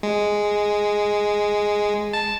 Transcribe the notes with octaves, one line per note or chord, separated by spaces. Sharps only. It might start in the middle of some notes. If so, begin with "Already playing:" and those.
G#3
A5